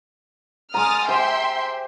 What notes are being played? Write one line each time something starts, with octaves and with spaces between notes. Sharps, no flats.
G#3 A#5 D#6 F6 A6
G4 C5 E5 G5 C6